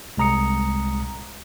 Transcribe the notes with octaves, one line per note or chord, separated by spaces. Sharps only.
C2 G#3 A#5 D#6 C#7